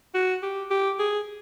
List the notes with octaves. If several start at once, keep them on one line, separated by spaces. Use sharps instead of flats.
F#4
G4
G4
G#4